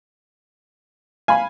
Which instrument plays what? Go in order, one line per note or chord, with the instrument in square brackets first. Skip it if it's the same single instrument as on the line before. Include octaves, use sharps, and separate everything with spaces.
[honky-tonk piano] F5 B5 [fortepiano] G#5